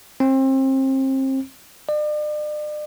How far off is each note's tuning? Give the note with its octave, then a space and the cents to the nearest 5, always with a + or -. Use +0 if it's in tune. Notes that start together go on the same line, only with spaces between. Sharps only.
C4 +30
D5 +40